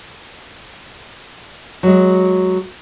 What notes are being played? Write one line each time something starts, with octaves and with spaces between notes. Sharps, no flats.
F#3 G#3